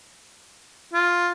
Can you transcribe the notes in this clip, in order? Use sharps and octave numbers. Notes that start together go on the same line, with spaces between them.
F4